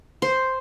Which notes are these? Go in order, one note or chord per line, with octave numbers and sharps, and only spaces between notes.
C5